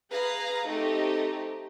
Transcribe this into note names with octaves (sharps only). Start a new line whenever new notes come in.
G#4 B4 F5 A#5
A3 C4 D#4 G4